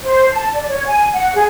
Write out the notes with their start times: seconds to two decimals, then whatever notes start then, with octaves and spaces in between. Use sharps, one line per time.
0.03 C5
0.33 A5
0.53 D5
0.68 C#5
0.86 G#5
1.13 F#5
1.35 G#4